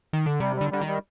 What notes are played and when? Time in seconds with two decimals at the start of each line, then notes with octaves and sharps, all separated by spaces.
0.13 D#3
0.26 D3
0.40 C3 G3
0.56 D3 G3
0.71 D3 G3
0.81 D#3
0.87 G3